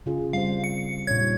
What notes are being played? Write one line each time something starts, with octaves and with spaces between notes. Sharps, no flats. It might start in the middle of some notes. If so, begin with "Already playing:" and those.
C#3 F4 G#4
G3 C4 C5 F5
C#7
A#2 D4 C#5 G#6
G3 D#4